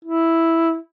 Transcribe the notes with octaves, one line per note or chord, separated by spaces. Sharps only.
E4